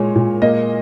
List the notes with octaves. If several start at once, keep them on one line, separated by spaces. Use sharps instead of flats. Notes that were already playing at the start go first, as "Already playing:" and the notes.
Already playing: A#2 G#3 C#5
A#2
A#3 D#5